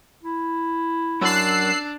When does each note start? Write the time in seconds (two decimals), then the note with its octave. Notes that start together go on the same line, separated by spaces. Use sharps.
0.24 E4
1.21 F#2 D4 E6 F#6 C7